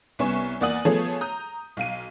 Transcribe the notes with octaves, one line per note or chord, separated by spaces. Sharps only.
C2 B3 C#4 G#5 C#6 E7
E2 A#3 D5 F#5 D#6 F#7
F3 A3 B3 G#4 A4 C#5
A#5 D#6 G6
B1 F5 D#7